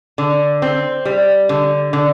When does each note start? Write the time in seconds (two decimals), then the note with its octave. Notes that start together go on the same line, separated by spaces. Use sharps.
0.18 D3
0.62 C4
1.05 G3
1.49 D3
1.93 D3